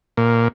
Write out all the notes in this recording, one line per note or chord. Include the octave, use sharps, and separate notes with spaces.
A#2